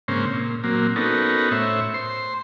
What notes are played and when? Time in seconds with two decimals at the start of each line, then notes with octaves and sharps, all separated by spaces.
0.08 G#2 C#3 A#3 C4 C#4 C5
0.34 A#2
0.64 A#2 F#3 A#3 C4
0.96 B3 C#4 D#4 F#4 A4 A#4
1.51 A2 C5 C#5 E5
1.94 C5 C6